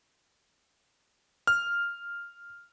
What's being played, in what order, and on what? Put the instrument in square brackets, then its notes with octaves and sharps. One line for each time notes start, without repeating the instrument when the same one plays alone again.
[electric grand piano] F6